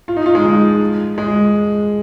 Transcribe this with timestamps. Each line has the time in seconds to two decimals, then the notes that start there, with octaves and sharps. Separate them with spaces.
0.08 F4
0.17 D#4
0.26 F4
0.35 G#3
0.45 F3
1.18 G#3